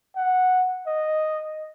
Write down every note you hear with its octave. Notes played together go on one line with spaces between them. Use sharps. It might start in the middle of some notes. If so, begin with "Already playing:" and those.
F#5
D#5